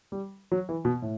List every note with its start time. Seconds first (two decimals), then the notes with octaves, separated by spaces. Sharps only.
0.12 G3
0.52 F#3
0.69 E3
0.85 B2
1.02 A2